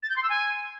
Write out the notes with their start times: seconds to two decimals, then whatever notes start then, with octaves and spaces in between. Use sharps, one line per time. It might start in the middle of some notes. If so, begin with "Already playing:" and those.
0.02 A6
0.09 G6
0.16 C6
0.23 E6
0.29 G#5